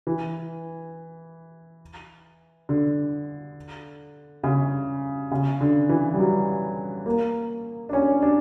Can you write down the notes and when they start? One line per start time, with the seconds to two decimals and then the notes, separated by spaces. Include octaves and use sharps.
0.07 E3
2.69 D3
4.43 C#3
5.31 C#3
5.61 D3
5.89 E3
6.14 G3
6.18 F#3
7.06 A#3
7.89 D4
7.93 C#4
8.22 D4